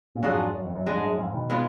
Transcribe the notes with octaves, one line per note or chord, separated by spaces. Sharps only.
A#2
F2 G#2 F#3 D4 F4 G#4
F#2
F2
F#2
F2 G#3 D4 G#4
G#2
F#2
F2 G#2
B2 D#3
G#3 B3 F4